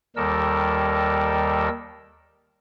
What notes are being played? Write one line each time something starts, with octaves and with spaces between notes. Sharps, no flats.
D#2 D#3 G3 A4 A#4 E6